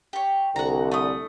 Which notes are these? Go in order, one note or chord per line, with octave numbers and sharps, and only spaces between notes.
G4 C#5
C2 D3 F#4 A#5
A3 D#6